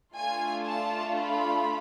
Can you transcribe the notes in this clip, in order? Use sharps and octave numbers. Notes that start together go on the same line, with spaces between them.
A3 D4 F4 G#5
A5
B5